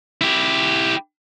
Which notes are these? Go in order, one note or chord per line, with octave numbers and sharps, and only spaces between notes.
E4 G4